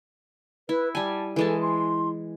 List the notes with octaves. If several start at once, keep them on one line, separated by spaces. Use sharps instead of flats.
E4 B4
G3 G#5 A5
E3 G#3 A4 A5
C6